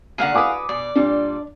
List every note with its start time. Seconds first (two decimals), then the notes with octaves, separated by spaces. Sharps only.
0.18 D3 A#3 G#4 F5 F#5
0.35 F#4 B4 G#5 D6 D#6
0.69 B2 D5
0.95 A#2 G3 D4